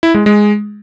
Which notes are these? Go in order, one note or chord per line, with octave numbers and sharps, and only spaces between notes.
E4
G#3
G#3